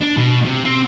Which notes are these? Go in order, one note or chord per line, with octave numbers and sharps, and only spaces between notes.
D4
B2
C3
C4